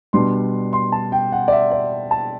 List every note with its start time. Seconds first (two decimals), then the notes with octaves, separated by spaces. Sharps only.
0.13 B2 G3 D4 C6
0.73 C6
0.92 A5
1.12 G5
1.32 F#5
1.48 D5
1.52 E5
1.71 D5
2.11 A5